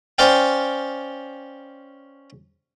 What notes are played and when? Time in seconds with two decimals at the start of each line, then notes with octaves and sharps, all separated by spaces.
0.18 C#4 C5 D5 F5 G5